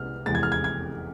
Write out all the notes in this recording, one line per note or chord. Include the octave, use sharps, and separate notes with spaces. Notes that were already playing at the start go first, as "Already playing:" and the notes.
Already playing: C2 C3 G#3 B3 F6
F1 E2 C3 G#3 A6
G#6
F6
G#6
G#6